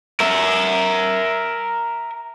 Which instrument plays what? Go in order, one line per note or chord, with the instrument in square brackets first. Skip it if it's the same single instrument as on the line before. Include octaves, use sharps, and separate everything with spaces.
[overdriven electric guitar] A#4 E5